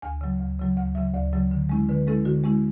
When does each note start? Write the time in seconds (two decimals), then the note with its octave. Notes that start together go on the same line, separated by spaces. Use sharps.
0.02 D2 G#5
0.21 C#3 F#3
0.39 D2
0.59 C#3 F#3
0.77 D2 F#5
0.95 C#3 F#3 E5
1.14 D2 D5
1.33 C#3 F#3
1.51 D3
1.69 G#3 C#4 E4
1.89 D3 B4
2.07 G#3 C#4 E4 A4
2.25 D3 F#4
2.44 G#3 C#4 E4